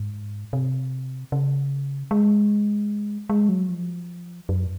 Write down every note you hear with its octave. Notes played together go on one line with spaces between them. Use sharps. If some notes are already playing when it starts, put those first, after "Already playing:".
Already playing: G#2
C3
C#3
G#3
G#3
F#3
F3
F#2